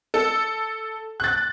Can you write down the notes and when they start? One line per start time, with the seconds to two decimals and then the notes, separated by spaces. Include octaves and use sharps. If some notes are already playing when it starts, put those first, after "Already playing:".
0.14 A4
1.20 F#6 A6